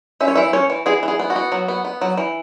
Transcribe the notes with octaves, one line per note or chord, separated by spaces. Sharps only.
C#4 E5
C#5
E3 E5
C#4 C#5
E3
E3 G#4
E3
G#4
B3
F#4
B3
F#3
B3
B3
F#3
E3